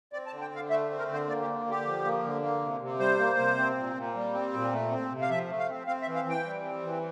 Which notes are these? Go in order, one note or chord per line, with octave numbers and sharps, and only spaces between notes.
C4 D5
A5
D3
G5
D3 F5
A3 E5
C4
A#4
D3 C5
A#3 D5
G4
D3
D3 G4
F3
A#3
D3
A#3
C3
C3
G3 C5
A#3
C3
C4
A#2
A#2
G3
C4
A#2
A3
C4
C3
F5
F3 E5
A3
F5
C4
C4 F5
E5
E3
F5
E3
G5
G3
C4
E3